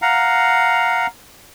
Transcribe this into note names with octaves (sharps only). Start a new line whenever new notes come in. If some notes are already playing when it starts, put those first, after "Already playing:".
F5 F#5 A#5